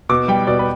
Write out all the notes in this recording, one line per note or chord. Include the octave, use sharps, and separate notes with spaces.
B2 D6
G3 G5
B2 D5
B4